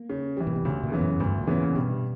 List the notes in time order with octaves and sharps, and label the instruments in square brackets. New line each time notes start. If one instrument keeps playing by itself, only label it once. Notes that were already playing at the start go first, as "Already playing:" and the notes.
Already playing: [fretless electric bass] A#3
[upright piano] C#3
E3 G3
[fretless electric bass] A#2
B2
[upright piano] D2 [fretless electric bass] C#3
[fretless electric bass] A#2
[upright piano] C#3 E3 B3
[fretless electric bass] F#2
[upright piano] D2 [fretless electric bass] G2
[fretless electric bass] A#2
[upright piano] C#3 E3 B3
[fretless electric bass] A#2
[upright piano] G2 [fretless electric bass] B2